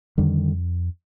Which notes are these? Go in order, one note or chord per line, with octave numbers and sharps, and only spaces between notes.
F2 D3 D#3 G3